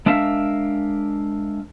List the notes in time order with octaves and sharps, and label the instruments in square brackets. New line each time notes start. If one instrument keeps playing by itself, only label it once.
[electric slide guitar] G#3 D4 A#4 E5 F5